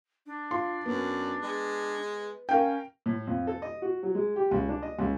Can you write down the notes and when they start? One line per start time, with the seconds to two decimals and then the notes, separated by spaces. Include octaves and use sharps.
0.26 D4
0.51 F4 C6
0.86 F#2 B3
1.42 G#3
2.49 C#4 A#4 F5 G5
3.06 A2
3.27 F2
3.47 A4
3.62 D#5
3.82 F#4
4.03 F#3
4.15 G#3
4.36 G4
4.51 C#2
4.69 D4
4.82 D#5
4.99 C#2